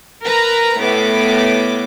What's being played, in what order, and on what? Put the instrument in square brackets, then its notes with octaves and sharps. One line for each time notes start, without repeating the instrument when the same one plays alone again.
[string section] A#4 B4 A#5
A2 B3 D6